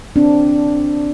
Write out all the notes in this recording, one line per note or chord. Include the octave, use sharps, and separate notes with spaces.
C4 D4